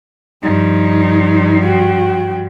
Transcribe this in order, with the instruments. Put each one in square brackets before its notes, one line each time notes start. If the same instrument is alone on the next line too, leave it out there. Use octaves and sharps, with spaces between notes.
[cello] G2 F3 [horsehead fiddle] D#4
[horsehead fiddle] F#4 G5